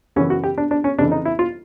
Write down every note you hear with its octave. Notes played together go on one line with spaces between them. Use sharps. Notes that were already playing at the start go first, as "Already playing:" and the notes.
F#2 C#3 E3 C#4
F#4
G4
D4
D4
C#4
F2 C#3 E3 D4
D#4
E4
F4